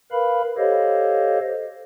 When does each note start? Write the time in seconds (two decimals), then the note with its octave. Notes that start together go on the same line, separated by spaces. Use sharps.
0.12 A#4 B4 F5 B5
0.58 G4 A4 C5 C#5 D#5 F5